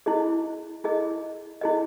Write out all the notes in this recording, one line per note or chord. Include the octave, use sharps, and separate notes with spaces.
E4 G#4 D#5
E4 G#4 D#5
E4 G#4 D#5